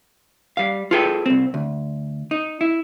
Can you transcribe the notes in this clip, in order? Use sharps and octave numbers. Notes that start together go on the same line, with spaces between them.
G3 F5
F4 G#4 A4 B4 G5
C2 C4
D2
D#4
E4